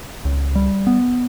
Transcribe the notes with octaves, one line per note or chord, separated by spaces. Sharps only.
C#2
G3
B3